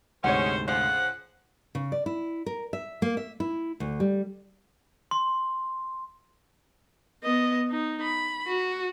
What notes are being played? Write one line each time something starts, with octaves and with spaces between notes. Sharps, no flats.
D2 G#2 C3 G#3 C#4 C5 C#5 F#5
C#3 F3 C5 F#5
C#3
D5
E4
A#4
E5
A#3
E5
E4
D2
G3
C6
B3 D#5
D#4
B5
F#4